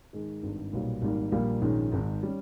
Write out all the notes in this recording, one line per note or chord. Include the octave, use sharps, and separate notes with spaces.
G#2 D#3 G#3
G#1 G2 D#3
B1 A#2 G3
G#1 G#2 G3 A#3
A#1 A#2 G3 A#3
A#1 G#2 D#3 G#3 C#4
G#1 G#2 D#3
G3 C#4